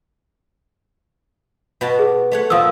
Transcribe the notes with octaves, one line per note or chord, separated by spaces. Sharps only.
B2 F#4 A5
G#4
A3 C#5 F#5
A#2 F3 F5 D#6 E6